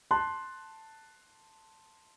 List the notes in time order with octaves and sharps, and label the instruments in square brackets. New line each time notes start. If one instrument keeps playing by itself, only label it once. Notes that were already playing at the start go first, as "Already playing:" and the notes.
[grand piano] A5 C6 F#6